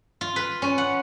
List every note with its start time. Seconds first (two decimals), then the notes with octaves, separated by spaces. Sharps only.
0.21 F4
0.36 B4
0.62 C#4
0.78 F#5